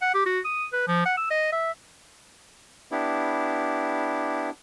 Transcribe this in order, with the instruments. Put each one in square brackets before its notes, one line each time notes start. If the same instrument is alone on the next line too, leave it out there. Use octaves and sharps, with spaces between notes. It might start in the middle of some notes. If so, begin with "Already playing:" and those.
[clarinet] F#5
G4
F#4
D#6
B4
F3
F#5
E6
D#5
E5
[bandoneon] B3 D4 E4 G4